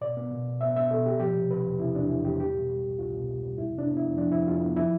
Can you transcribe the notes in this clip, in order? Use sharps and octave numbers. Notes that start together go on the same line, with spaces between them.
B2 D5
B3
B2
B2
B3 E5
B3 E5
B2 A4
B2 G4
F3 G4
C3
C3 B4
E2
C3 E4
E2 D4
E2 E4
E2 G4
G3 G4
B2
G3
C2
C2 F4
B2
G3
G3
F2 E4
C3
D4
B3
E4
F2
F3 D4
F2 E4
F2 F4
B3
F3 E4